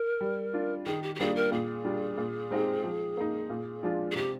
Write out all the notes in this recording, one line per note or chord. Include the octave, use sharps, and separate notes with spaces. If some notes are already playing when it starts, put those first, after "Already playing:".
Already playing: A#4
G3
D4 F4
D#3 G#4
G4
G4
G3 A#3 D4 F4 G#4
A#4
A#2 G#4
G3 D4 F4
A#2
G#3 C4 D#4 G4
F3
A#3 D#4
A#2
F3 G#3 D4 F4
G#4
C3 G4